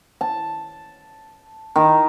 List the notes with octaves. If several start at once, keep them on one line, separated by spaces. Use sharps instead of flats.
A5
D#3